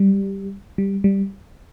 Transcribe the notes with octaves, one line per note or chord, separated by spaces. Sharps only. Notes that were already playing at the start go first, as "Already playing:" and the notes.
Already playing: G3
G3
G3